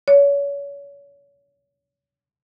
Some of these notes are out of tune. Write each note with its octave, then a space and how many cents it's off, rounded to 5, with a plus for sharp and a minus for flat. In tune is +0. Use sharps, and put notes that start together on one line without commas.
C#5 +35